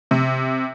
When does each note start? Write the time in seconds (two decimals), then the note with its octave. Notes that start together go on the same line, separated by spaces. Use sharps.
0.11 C3